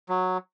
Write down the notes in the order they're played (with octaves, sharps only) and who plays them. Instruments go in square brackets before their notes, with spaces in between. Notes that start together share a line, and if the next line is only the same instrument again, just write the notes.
[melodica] F#3